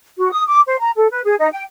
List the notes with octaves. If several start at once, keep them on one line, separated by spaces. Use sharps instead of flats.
F#4
D#6
D6
C5
A#5
A4
B4
G#4
D#4
G5